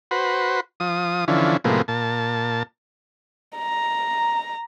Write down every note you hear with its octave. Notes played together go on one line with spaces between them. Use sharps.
F#4 B4 C5
F3 D#6
D3 E3 F3 C#4
A2 C3 F3 G#3 A#3 B3
A#2 A5
A#5